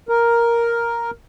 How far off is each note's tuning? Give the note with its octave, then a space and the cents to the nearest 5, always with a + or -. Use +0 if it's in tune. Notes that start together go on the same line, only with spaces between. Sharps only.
A#4 +5